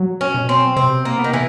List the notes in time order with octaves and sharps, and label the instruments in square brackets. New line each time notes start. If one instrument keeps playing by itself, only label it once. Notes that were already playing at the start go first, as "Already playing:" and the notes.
Already playing: [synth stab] F#3
[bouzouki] C#4
[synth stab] B2
[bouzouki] C4
[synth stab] C3 [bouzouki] C4
[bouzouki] A#3
[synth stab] B3
[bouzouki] D#3
E3